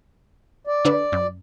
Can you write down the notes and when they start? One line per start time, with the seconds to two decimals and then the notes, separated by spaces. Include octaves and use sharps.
0.67 D5
0.85 D3 D4 B4
1.12 F#2